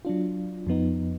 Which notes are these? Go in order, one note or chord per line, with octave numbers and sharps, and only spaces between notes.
F#3 D4 F4
F2 F3 B3 D#4